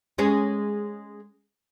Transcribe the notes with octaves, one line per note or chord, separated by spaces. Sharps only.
G#3 C#4 G#4